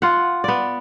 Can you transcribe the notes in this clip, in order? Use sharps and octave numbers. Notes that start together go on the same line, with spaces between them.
F4 F#5
B3 D5